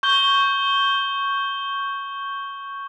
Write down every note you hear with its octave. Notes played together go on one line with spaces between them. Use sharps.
C#6 G6 G7